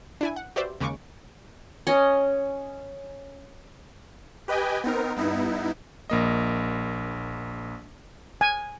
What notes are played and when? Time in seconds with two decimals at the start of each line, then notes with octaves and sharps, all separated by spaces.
0.21 D4 E4 G#5
0.36 F#5
0.56 F#4 G4 B4 C5 D5 E5
0.80 D#2 C#3 G#3 C#6 D6
1.87 C#4 D#5
4.48 G4 B4 D#5 G5 G#5
4.84 B3 C4 D#4 A#4
5.16 G2 B3 D#4 E4
6.10 A#1 A#3 D#5
8.41 G#5